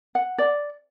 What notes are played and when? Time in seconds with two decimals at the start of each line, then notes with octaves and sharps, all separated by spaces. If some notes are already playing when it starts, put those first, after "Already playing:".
0.15 F#5
0.38 D5